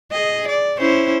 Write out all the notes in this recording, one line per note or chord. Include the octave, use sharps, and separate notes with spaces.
G#4 D#5
D5
C#4 E4 C5